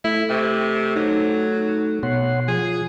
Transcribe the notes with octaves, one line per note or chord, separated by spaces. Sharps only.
A3 E4
C3 G5 C#6
F#3 D#4
B2 C#5 F#5 C6
F3 G#4